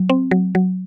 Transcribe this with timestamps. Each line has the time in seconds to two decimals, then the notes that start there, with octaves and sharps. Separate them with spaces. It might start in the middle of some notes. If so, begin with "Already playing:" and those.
Already playing: F#3
0.10 C4
0.31 F#3
0.55 F#3